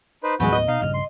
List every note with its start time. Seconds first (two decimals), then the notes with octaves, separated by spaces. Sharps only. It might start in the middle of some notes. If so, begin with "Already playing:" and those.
0.23 D#4 B4 C5
0.40 D#2 A2 E3 G#3 B3 F#4 B4 G6
0.53 D#5
0.68 B2 D#4 F5
0.81 A#1 G2 C#3 F6
0.94 C6